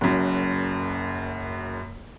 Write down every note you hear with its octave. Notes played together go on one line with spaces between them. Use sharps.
F#1 F#2